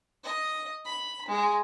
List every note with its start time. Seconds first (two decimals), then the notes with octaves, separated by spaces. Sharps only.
0.24 D#5
0.85 B5
1.28 G#3